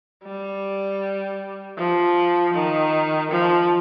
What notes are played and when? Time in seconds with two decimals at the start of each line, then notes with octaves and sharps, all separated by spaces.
0.25 G3
1.78 F3
2.54 D#3
3.31 F3